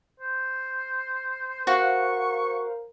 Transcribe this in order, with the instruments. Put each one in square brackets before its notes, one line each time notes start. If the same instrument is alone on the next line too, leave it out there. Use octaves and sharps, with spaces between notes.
[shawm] C5
[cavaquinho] F#4 F#5 [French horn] A#4 [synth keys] C5 F5 [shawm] C#6